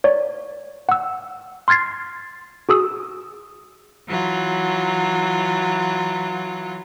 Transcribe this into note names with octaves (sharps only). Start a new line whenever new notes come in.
C#5 D5
F#5 E6
C6 F6 G#6 A6 C7
F#4 G#4 D#6 E6
E3 F#3 F4